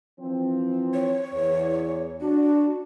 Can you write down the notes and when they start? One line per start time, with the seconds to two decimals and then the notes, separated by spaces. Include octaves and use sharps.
0.20 E3 F3 C4
0.94 C#5
1.34 E2
2.21 D4 F#4